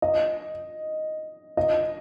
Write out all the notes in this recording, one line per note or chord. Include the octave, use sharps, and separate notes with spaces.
D#5
D#5